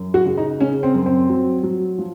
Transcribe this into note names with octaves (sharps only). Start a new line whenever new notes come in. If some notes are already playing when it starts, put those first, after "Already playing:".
Already playing: F#2
F#4
C#3
D#4
C#3 C#4
C4
F#2
C4
F#3
F#3
F3